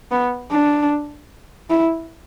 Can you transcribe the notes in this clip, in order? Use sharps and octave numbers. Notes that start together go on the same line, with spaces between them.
B3
D4
E4